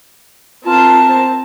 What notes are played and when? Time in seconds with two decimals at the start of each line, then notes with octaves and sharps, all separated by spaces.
0.65 C4 F4 A#4 A5
1.08 C5